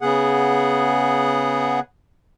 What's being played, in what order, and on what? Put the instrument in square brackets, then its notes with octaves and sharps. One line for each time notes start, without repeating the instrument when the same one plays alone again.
[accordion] C#3 B3 G#4 F#5